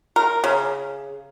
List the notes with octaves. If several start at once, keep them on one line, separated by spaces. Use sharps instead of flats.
A#4
C#3